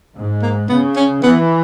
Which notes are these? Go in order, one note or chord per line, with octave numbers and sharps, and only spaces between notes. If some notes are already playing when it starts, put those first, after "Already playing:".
G#2
A#3
C#3 B3
C#4
E3 B3